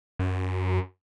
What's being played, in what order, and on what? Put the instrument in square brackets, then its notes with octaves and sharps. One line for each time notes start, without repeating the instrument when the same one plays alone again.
[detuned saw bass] F#2